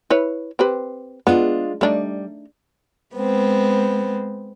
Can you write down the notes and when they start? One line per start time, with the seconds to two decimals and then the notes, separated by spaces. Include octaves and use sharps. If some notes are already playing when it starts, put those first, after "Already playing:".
0.10 E4 B4 C#5
0.59 C4 G4 B4
1.27 G#3 B3 D4 F4
1.81 G3 A3 D4 D#4
3.15 G#3 B3 C4